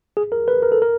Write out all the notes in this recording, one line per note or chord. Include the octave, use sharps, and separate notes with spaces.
G#4
A#4
B4
A#4
A4
A#4